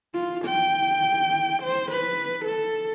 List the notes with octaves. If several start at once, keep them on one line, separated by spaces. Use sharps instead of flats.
F4
G5
C5
B4
A4